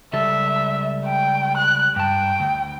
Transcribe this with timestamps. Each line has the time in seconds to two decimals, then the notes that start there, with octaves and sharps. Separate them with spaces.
0.13 C#2 G3 A4 E5
1.05 G5
1.57 F#6
1.96 G2 G5 A5
2.40 D2